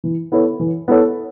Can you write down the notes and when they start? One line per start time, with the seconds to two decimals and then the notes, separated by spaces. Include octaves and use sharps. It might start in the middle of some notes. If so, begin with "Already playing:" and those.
0.04 E3
0.32 B3 E4 A4 C#5
0.60 E3
0.88 B3 E4 A4 C#5